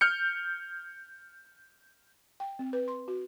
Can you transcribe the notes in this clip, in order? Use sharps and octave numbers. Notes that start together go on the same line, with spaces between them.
F6 G6 C#7
G5
C4
B4
C6
F#4